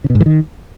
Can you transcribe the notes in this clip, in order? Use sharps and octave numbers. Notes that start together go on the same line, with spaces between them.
C#3
B2
G#2
E3
D#3